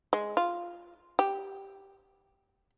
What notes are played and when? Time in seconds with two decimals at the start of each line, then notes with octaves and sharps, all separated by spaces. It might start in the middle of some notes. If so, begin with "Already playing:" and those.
0.13 G#3
0.37 F4
1.19 G4